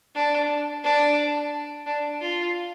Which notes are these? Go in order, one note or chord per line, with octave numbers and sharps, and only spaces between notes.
D4
D4
D4
F4